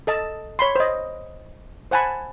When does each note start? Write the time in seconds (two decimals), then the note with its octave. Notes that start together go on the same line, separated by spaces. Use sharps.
0.07 A4 D#5 A5
0.59 C#5 B5 C6
0.76 C5 D#5
1.91 C5 F#5 G#5 A5 B5